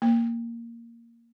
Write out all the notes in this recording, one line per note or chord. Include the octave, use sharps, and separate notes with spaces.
A#3